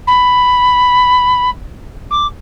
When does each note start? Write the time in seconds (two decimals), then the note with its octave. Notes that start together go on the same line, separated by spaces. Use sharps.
0.07 B5
2.10 D6